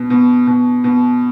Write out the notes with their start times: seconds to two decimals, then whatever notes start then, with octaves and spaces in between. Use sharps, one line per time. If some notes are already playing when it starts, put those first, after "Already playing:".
Already playing: B2
0.10 B2
0.47 B2
0.84 B2